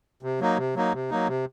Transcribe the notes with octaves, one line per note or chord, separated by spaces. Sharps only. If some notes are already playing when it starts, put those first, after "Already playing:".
C3
F#3 A#3 D#4
C3
F#3 A#3 D#4
C3
F#3 A#3 D#4
C3